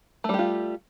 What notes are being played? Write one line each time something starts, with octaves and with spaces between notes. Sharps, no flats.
G3 A3 F4 G4